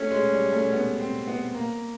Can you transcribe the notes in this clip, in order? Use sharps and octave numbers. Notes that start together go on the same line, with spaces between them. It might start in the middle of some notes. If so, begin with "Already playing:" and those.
Already playing: A3 C#4
G#3
G3
A3
B3
C4
B3
A#3